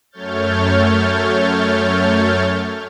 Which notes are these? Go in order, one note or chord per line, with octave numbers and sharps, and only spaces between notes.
F#2 A3 C#5 F6 G6 A6